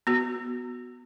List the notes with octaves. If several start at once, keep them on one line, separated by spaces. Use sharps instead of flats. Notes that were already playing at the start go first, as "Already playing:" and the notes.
B3 F#4